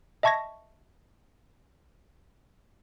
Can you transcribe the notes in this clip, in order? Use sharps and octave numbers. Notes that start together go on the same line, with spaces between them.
D#5 E5 A5 C#6 G#6 A#6